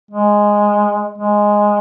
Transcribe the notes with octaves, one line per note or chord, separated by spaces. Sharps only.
G#3
G#3